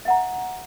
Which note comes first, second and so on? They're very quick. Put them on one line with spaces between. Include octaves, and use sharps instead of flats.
E5 F#5 A#5